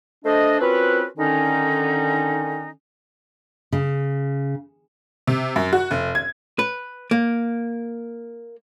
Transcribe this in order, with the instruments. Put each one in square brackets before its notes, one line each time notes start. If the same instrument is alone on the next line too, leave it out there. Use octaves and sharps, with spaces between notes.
[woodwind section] A3 D4 C5 D#5
C4 C#4 F4 F#4 A#4 B4
D3 D#3 C#4 D#4
[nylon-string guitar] C#3
[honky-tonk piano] C3
F#2
F#4
F1
G#6
[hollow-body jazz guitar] B4
A#3